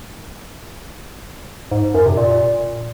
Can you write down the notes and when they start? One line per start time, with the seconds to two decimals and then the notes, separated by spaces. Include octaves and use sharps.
1.72 G#2
1.83 G#2
1.94 F#2
2.06 C3
2.17 A#2